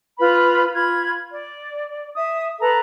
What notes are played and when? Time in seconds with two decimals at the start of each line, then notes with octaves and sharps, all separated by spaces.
0.19 F4 B4 B5
0.74 F4 B5 G#6
1.30 D5
2.15 E5 D#6
2.60 A4 B4 A#5